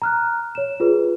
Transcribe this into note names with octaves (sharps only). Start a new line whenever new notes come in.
A#5 F6 F#6
C#5 E7
F4 G#4 B4